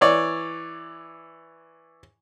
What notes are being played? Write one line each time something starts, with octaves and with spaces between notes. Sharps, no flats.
E3 C#5 D5